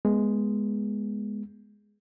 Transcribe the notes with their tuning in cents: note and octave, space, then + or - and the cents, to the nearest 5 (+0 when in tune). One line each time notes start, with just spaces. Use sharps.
G#3 +0 B3 -15